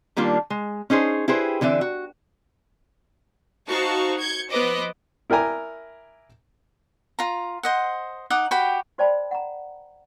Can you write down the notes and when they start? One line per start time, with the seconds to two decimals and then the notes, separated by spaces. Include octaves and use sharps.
0.16 D#3 G3 A#3 D4 F4
0.50 G#3
0.90 C#4 D#4 G#4 C5
1.28 E4 G4 G#4 B4 C5
1.61 D3 E3 C4 D5 E5
1.81 F#4
3.69 D#4 F#4 C5 F5 A5 C#6
4.18 G6 G#6 C#7
4.49 F3 B3 B4 C5 D#5 D6
5.30 E4 A#4 D5 G5 G#5 A#5
7.19 F4 A#5
7.63 C5 D#5 F#5
8.30 D#4 F#5 D6 D#6
8.51 F#4 G4 G5 B5
8.98 F#4 C5 D5 G5 A5 B5
9.31 F#5 A#5